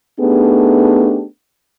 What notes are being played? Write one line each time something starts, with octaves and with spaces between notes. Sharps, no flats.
A3 B3 D4 D#4 G4 G#4